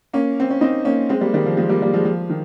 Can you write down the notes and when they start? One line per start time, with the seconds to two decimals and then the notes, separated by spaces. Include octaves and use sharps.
0.13 A#3 C#4
0.40 C4
0.50 C#4
0.61 C4 D#4
0.85 A#3 C#4
1.09 G#3 C4
1.21 G3 A#3
1.34 D#3 G3
1.46 F3
1.57 F3 G#3
1.69 G3 A#3
1.82 G3 A#3
1.93 F3 G#3
2.05 F3
2.30 D#3